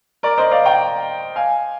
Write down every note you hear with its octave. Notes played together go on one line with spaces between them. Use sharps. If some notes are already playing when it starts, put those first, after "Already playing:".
A#4 D5
C5 D#5
D5 F5
G5 A#5
F5 G#5